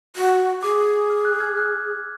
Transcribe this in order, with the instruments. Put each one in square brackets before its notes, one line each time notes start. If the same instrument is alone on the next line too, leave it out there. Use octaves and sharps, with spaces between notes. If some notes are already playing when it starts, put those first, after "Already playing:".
[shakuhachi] F#4
[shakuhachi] G#4 [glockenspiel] D6
[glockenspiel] F6
F#6
F6 G#6
F#6